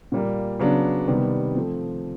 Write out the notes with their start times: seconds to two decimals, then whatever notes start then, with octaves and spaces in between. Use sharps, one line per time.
0.12 A#2 G3 A#3
0.60 C#3 F#3 B3 D4
1.07 C3 D#3 G3 B3
1.55 F3 A3 C4